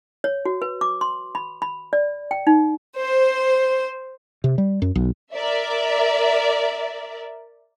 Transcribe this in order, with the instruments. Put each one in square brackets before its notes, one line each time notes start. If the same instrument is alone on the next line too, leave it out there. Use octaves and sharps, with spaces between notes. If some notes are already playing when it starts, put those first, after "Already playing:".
[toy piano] C#5
F#4
B4
D6
C6
B5
B5
D5
G5
D#4
[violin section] C5
[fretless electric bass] C3
G3
F#2
B1
[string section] A#4 D5 E5